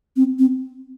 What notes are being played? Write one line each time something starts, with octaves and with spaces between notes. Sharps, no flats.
C4
C4